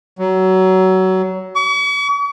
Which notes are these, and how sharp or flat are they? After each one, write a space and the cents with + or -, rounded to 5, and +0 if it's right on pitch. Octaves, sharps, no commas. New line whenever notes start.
F#3 +20
C#6 +45